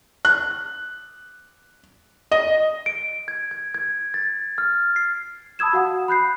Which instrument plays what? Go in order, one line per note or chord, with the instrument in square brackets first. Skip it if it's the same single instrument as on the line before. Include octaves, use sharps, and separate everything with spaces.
[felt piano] F#6
D#5
[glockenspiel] D7
G#6
G#6
G#6
A6
F6
C7
[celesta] A5 B5 D#6 E6 G#6 E7
F#4 F5 F#5 D#6
B5 F#6 G6 C7